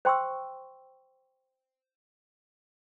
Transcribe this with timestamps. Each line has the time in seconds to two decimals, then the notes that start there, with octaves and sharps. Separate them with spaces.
0.05 C5 G5 C6 C#6 E6